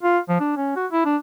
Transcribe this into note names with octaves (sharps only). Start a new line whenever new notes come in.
F4
F3
D4
C#4
F#4
E4
D4